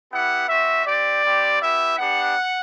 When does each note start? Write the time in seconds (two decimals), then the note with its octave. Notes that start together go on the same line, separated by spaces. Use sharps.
0.11 B3 E4 G4 F#5
0.48 C4 F#4 E5
0.85 C4 G4 D5
1.23 G3 C4 G4
1.60 B3 E4 G4 E5
1.97 B3 D4 G4 F#5